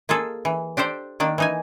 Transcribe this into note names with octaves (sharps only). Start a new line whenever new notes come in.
A#3 F4 G#4 A4
E3
D4 G4 A4 C5 D5
D#3 A#3 D4
E3 D#4 G#5